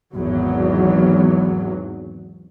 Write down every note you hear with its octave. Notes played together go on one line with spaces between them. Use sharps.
G#1 E2 F#3